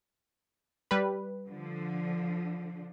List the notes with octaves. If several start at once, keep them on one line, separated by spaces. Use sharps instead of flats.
G3 B4
D3 F3